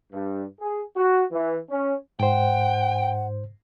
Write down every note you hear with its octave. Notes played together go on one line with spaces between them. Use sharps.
G2
G#4
F#4
E3
C#4
G#2 C5 F#5 G5